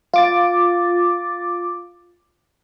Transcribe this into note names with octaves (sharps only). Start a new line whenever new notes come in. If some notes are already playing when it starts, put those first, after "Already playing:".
F4 D6 A6